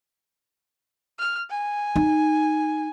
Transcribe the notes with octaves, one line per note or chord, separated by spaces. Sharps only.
F6
G#5
D#4